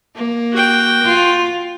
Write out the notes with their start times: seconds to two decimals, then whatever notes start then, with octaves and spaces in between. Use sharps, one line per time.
0.15 A#3
0.53 F#4 G5
1.04 F4